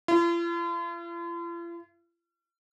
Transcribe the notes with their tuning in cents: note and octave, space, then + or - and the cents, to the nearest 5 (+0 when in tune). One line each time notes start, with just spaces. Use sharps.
F4 -45